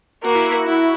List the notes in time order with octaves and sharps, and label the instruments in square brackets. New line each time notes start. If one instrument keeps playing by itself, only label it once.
[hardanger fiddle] A#3 [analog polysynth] F#4
[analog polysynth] E4
F#4
[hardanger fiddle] E4